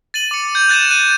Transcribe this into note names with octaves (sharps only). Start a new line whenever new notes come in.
A6 D#7 F#7
D6 C#7
G6
F#6 A6 D#7 E7
F#6 D#7